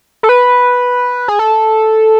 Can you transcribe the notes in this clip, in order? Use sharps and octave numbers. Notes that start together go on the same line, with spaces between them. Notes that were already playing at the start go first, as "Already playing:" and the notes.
A4
B4
G#4
A4